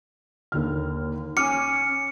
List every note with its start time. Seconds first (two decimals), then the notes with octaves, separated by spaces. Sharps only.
0.52 D#2 D3 F6
1.37 C#4 D6 F6 C#7 D#7